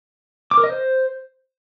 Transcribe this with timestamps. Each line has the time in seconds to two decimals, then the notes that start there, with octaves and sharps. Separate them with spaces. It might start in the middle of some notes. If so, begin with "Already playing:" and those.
0.51 D6
0.58 A#4
0.64 D#5
0.70 C5